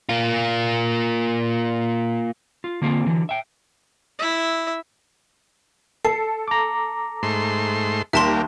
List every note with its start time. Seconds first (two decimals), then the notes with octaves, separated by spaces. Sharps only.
0.09 A#3 F4
2.64 F4
2.82 D3 A#3 C4 F4 F#4 G#4
3.06 D3 E3 F#3
3.29 E5 G5
4.19 E4 E5
6.05 A4 C7
6.48 A#5 D6
7.23 G#2 A3 C6
8.13 D#2 G3 A#3 E5 A5 C6